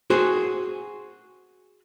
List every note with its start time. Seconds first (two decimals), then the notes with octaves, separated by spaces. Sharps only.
0.10 F#4 G#4 C5